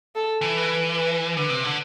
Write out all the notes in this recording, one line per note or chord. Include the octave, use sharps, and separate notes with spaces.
A4
E3
B4
B4
D3 B4
C3
D3